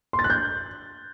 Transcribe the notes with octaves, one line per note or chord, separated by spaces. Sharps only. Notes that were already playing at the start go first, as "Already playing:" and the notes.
C6
A6
F#6
G6